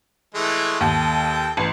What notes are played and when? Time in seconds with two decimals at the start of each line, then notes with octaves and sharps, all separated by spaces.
0.35 E3 G#3 A3
0.81 D#2 A4 G5
1.57 A1